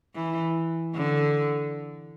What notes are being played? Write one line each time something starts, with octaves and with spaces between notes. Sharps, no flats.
E3
D3